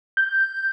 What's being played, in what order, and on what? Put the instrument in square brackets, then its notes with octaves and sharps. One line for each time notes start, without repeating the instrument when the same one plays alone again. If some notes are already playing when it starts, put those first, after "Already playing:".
[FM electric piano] G6